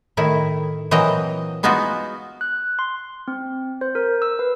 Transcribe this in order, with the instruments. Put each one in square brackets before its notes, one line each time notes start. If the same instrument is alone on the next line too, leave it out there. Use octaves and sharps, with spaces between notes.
[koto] A2 D#3 E4
A#2 E3 F#3 C4 D#5 A#5
G#3 B3 D#4 F4 F#4
[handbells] F#6
C6
C4
C5
A#4
E6
B4